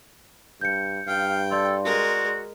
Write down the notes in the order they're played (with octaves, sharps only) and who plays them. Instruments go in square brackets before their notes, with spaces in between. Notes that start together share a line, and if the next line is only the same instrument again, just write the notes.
[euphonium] G2 [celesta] G6 C#7
[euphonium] G2 [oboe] F5 [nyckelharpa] G5
[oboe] A4 [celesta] D5 C6
[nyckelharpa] G#3 A#4 [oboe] F#4